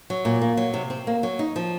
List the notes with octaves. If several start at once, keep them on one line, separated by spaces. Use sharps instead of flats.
F#3
A#2
A#3
F#3
C3
C4
A#3
F#3
D#4
F3